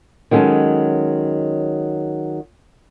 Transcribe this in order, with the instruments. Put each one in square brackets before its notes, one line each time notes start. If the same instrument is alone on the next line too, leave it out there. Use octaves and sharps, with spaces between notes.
[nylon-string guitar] D#3 F#3 G#3 C#4 A4